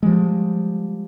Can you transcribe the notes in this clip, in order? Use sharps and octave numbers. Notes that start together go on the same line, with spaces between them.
F3 G3 G#3